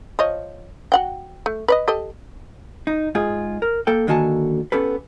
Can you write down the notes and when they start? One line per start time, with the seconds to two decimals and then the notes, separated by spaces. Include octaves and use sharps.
0.19 F3 C#5 D#5
0.92 F#4 F#5 G5
1.46 A3
1.68 B4 D5 D#5
1.88 G4 A4 D#5
2.87 D#4
3.15 G#2 F4 G#4
3.62 A#4
3.87 A#3 A4 G5
4.07 D3 D#3 A#3 F#4 G#5 A5
4.72 B3 C#4 G4 A4 B4